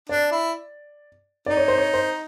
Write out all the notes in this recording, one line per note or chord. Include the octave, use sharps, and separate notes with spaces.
D4 D5
E4
D#4 D5
C#5
C5
C#5
C5